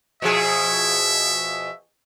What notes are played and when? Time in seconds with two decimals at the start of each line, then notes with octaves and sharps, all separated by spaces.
0.22 B2 F3 G#4 E5